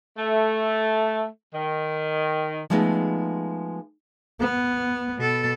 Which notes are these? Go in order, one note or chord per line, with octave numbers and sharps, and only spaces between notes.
A3
D#3
F3 G#3 A3 B3 D#4
B3
B2 A4